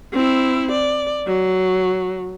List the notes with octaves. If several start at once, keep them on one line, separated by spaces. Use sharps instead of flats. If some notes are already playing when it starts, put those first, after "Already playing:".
C4 E4
D5
F#3